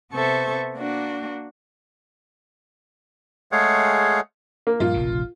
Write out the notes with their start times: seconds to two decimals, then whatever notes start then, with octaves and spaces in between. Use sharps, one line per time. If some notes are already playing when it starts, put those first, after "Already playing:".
0.12 C3 B3 A4 C5 E5 C#6
0.75 A#3 D4 F#4
3.52 G#3 A3 G#4 C#5 F5 F#5
4.67 A#3
4.80 G2 A#2 F3 F4
4.94 F1 A#1 C#3